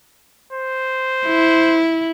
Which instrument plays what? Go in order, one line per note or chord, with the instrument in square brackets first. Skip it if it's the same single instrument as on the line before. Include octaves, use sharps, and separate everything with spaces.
[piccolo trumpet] C5
[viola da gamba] E4